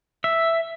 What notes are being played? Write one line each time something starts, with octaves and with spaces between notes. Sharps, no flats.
E5